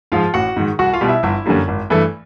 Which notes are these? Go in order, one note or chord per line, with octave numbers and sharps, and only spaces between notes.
G#2 F3 G#3 F4 F5
A1 F#4 F#5
G#2 D#3
C2 F#4 F#5
F4 F5
B2 G3
E4 E5
G1 E4 E5
F#2 D3 G3 A#3
G#1
G2 E3 A3